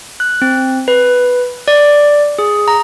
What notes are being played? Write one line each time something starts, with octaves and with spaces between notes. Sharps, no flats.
F#6
C4
B4
D5
G#4
A#5